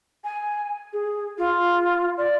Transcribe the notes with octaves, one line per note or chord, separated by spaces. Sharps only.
G#5
G#4
F4
D5